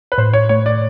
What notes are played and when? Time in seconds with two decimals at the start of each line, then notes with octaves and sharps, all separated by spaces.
0.12 B4
0.18 A2 C5
0.33 C#5
0.49 A3 C#5
0.66 D5